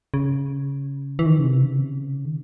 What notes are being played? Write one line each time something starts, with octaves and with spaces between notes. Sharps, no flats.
C#3
E3
D#3
C#3
C3
C#3
D#3